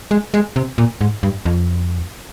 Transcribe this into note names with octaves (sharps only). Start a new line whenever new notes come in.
G#3
G#3
C3
A#2
G#2
G2
F2